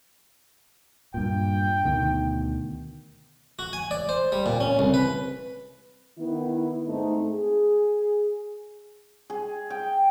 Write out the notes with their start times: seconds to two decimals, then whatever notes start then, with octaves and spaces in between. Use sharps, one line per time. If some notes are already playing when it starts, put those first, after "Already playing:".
1.14 G2 A#2 G5
1.84 D2 B2 D#3
3.59 F#4
3.73 G#5
3.91 D5
4.09 C5
4.32 G3
4.46 A#2
4.60 C#4
4.79 C2
4.94 B4
6.18 D#3 B3 E4
6.87 G#2 A3 C4 D#4
7.30 G#4
9.30 G#4
9.70 G5